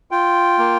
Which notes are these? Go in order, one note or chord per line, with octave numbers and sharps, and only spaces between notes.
F4 G5
A#3